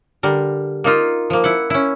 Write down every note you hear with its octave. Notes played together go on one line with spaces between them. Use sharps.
D3 G3 A#4
A#3 D#4 F4
F3 A#3
E4 F#5
C#4 E4